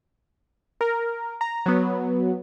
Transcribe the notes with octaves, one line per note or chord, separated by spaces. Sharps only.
A#4
A#5
F#3 B3